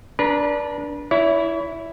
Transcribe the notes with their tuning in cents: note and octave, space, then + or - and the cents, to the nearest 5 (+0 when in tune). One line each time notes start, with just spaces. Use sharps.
D4 -10 B4 -35 A#5 +10
E4 +0 C#5 +40